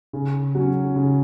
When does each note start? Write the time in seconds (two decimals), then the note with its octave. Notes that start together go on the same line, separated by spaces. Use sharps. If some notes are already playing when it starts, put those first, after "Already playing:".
0.13 C#3
0.55 F#3 C#4
0.96 C#3